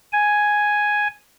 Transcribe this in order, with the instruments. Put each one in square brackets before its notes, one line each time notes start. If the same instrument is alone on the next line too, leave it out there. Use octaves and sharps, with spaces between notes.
[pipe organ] G#5